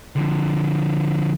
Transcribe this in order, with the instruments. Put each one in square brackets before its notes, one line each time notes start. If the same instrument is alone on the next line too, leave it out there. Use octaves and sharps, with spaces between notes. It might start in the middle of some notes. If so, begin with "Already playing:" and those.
[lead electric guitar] D3 F3